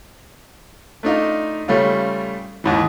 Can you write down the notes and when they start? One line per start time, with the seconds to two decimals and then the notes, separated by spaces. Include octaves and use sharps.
1.03 A3 D4 D#4 F4
1.68 C#3 G3 A3 C#4 F4
2.64 D#2 G#2 E3